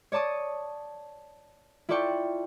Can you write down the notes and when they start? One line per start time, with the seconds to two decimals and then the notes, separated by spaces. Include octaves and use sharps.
0.12 C#5 D5 A5 C#6 D#6
1.89 E4 F4 A4 D5 G5 C#6